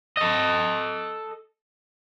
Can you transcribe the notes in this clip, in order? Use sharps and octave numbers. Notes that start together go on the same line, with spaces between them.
A4 D#5